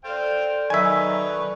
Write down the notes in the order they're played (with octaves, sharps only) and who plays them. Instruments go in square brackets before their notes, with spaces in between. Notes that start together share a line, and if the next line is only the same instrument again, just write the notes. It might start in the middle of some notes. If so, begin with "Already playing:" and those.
[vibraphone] A4 D5 [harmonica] C5 F5 G5
[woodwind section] D#3 F#3 [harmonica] B4 C#6 [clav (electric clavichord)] E5 G#5